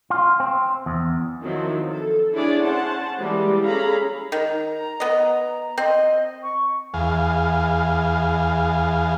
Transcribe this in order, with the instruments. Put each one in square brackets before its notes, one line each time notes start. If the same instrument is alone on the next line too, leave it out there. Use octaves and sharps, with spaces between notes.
[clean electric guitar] F4
C4
E2
[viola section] D#3 F3 F#3 C4 E4
A4
D4 E4 G#4 C#5 D5 G#5
C#4 C5 F#5 A5
E3 G3 G#3 A#3 G4
C#4 G#4 A4 F5 A#5 B5
[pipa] D#3 [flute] A#5
[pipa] B3 D#5
[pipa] C4 [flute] D#5
[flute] C#6
[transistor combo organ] E2 G#4 F5